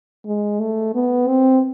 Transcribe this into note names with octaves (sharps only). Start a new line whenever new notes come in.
G#3
A3
B3
C4